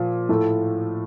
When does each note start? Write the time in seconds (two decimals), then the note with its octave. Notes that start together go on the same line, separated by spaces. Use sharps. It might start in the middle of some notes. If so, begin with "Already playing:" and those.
Already playing: A#2 F3
0.29 A2 F3 A3